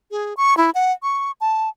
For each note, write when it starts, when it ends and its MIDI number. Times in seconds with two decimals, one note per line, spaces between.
0.11 0.34 68
0.37 0.56 85
0.57 0.70 64
0.75 0.92 78
1.03 1.32 85
1.41 1.69 81